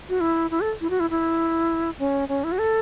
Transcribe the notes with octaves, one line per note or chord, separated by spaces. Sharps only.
F#4
E4
E4
A4
E4
F#4
E4
E4
C#4
C#4
E4
F#4
A4